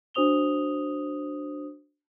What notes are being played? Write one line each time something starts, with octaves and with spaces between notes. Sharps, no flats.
D4 F#4 C5 D#6 F7 G7